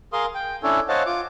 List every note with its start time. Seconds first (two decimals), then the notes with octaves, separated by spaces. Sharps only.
0.13 G#4 A#4 F5 C6 D#6
0.35 G5
0.63 C#4 D4 E4 A4 C#5
0.89 C5 C#5 D#5 F5 F#5 A5
1.06 F4 D6